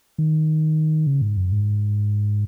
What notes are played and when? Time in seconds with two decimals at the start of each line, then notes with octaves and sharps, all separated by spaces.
0.18 D#3
1.07 C#3
1.22 G#2
1.37 F#2
1.52 G#2